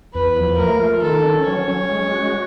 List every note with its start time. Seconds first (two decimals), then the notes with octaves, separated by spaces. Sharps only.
0.14 E2 B4
0.37 F3
0.58 A3 A#4
0.80 F4
1.02 D#3 A4
1.24 C#4
1.45 F#3 C#5
1.68 C#4
1.89 G#3
2.12 F#4